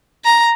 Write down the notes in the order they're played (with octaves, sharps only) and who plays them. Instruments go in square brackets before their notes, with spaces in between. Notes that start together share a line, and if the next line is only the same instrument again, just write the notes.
[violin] A#5